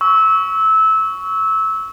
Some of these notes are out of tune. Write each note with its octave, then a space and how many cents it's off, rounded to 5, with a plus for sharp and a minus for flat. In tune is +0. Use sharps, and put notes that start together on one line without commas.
C#6 +15 E6 -20